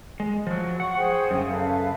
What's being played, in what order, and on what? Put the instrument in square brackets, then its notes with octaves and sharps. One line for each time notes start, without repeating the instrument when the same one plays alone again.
[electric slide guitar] G#3
F3 F#3
[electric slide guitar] F#5 [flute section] C#6
[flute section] G#4 C5 G5
[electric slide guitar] F#2 A2 C#3
[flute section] A4 B4 F5